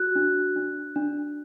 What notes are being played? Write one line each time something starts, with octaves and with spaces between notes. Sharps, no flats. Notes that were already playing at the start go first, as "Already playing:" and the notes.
Already playing: F#4 F#6
D4
D4
D4